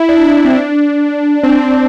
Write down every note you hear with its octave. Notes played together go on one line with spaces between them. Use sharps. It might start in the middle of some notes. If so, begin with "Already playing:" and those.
Already playing: E4
D4
E4
C4
D4
C4
D4